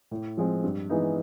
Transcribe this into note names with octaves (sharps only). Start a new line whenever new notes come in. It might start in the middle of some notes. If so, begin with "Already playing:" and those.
A2
F3 G#3 C4
G2
E3 G#3 B3 D#4